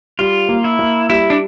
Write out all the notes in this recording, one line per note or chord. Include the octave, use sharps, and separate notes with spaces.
G3 F4
A#3
E4
A#3
G3 E4
D4